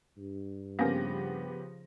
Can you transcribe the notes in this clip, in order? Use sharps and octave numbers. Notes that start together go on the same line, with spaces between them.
G2
C#3 F3 A#3 B3 C#4 G4 A#4 A#6